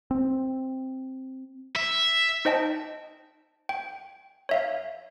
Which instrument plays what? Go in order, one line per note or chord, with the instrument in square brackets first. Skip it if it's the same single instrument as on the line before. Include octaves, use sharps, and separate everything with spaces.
[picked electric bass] C4
[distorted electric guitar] E5
[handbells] D#4 C5 D#5 G5 A5
G5
C#5 E5 F5